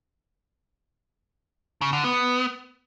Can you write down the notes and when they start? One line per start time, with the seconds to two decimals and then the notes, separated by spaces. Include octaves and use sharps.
1.81 C#3
1.93 D3
2.04 B3